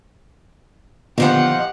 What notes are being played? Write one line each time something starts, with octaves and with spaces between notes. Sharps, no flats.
A#2 D3 D#3 F3 B3 D#4 G4 F#5